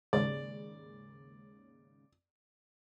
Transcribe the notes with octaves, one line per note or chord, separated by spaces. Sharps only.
D#2 G#2 C#3 D5